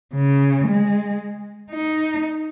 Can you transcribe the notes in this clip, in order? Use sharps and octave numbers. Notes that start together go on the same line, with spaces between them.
C#3
G#3
D#4